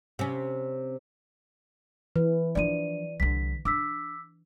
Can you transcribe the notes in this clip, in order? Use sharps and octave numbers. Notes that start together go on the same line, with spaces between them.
C3 C#4
E3 B4
F3 D4 D5 D#7
C2 D3 B6
D4 D6 E6 B6